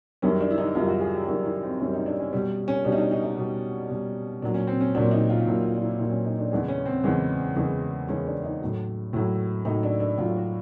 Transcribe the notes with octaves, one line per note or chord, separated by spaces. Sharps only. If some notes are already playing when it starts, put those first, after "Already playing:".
F#2 D#3 G3 C#4
D4
E4
D#4
F#2 D#3 G3 F4
F#4
G#4
G4
F#2 D#3 G3 F#4
E4
C4
F#2 D#3 G3 C#4
D#4
D4
C#4
B2 G3 C#4
C#4
B2 G3 D4
D#4
D4
D#4
D#4
B2 G3
B2 G3
A#2 F#3 D4
C#4
C4
C#4
A#2 F#3 D4
D#4
F4
A#2 F#3 E4
F4
F4
E4
A#2 F#3 E4
C#4
D#4
D4
E2 C#3 E3 G#3 D4
C#4
C4
E2 C#3 E3 G#3
E2 C#3 E3 G#3
E2 C#3 E3 G#3 C#4
D4
D#4
A2 F#3
A2 F#3 E4
A2 F#3 D#4
D4
D4
A2 F#3 F4
F#4